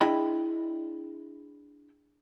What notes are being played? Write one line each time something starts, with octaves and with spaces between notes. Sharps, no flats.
D4 E4 G#4 D#5 G5 B5